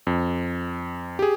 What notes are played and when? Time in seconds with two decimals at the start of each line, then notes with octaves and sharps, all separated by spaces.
0.07 F2
1.19 G4 G#4